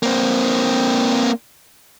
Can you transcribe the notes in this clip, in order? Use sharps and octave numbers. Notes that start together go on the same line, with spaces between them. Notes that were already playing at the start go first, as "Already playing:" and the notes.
A#3 C4